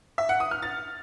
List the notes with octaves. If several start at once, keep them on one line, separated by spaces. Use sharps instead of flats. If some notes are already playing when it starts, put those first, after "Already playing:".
E5
F#5
D#6
F6
A6